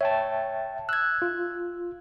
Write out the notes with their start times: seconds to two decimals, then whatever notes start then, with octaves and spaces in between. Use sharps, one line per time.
0.01 C#5 E5 G5 A5
0.89 E6 F#6 G#6
1.22 F4